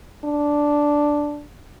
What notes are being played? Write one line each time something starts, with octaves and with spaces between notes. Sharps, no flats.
D4